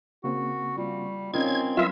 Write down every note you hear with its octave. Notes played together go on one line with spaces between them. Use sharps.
C#3 A#3 C4 F#4
G3 F4
C4 C#4 D#4 F4 A#4 D#5 G#6
F#3 G3 F4 B4 E5